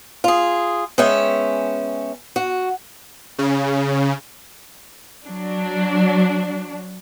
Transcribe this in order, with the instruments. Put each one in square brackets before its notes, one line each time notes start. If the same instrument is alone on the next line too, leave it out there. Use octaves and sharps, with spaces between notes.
[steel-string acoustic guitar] F4 G#4
G#3 B3 C#4 E5 G5
F#4
[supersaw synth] C#3
[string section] F#3 D4